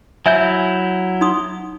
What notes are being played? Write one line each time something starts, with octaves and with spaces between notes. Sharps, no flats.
F#3 E4 C5 E5 G#5 G6
D#4 C6 D#6